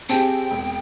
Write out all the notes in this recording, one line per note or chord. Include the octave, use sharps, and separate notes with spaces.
C4 G4 G#4 G5 A5
E1